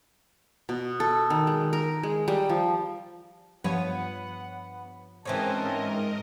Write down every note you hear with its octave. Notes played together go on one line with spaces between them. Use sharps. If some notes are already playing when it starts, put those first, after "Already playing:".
B2
A4
D#3
G#3
A#4
G#3
G3
F3
G2 F3 B3 C#5 F#5
G#2 E3 C4 C#4 A#4 D#5 A5